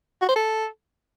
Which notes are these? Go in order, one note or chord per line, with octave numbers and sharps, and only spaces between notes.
F#4
C5
A4